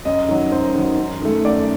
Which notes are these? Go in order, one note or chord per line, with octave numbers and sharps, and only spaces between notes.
F#2 D#5
D#3 F#3
F#2 C5
D#3 F#3
F#2
D#3 A3
F#2 D5